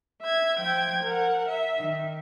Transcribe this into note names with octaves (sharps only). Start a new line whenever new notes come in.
E5 G#6
F3 G5 G#6
A#4 F#5
E5
D#3